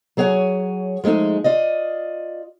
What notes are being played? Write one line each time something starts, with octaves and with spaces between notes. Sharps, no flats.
F#3 G#4 C#5 F#5 G#5
F3 G#3 A3 D#4 G#4
F4 D5 D#5